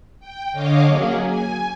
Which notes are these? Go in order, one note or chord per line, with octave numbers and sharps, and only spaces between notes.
G5
D3 C#5 D#5 F5 D6
F#3 A#3 C#4 G#4
G#5